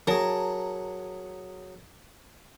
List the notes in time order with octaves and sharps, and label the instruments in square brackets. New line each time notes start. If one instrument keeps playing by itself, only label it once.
[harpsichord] F#3 G#4 [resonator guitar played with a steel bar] A#4 A5